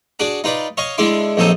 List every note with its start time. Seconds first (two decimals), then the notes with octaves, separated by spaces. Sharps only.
0.19 D4 F#4 G#4 F#5 D6
0.44 D#4 F4 B4 D5
0.77 C#5 D#5 F5 C#6
0.98 D3 G#3 D4 E4 C6 D6
1.37 A#1 F#2 C4 D#4 A4 D#6